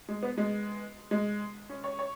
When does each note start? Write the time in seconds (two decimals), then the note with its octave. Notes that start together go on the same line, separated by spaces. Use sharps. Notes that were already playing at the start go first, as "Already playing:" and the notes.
0.09 G#3
0.23 B3
0.38 G#3
1.11 G#3
1.69 C#4
1.84 C#5
1.99 C#5